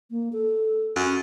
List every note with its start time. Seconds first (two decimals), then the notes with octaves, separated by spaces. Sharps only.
0.11 A#3
0.33 A4
0.96 F#2